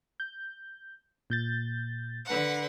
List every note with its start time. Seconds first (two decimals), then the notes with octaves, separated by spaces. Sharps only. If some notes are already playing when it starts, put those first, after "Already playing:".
0.20 G6
1.30 A#2 G6 A6
2.26 D3 B4 F#5